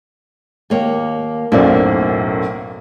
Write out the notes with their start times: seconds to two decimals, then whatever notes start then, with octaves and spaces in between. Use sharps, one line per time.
0.70 D#2 A#3 C#5
1.52 B1 F#2 A2 A#3 C5 D5